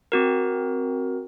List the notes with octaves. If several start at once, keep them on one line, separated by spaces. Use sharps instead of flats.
C4 F#4 A#4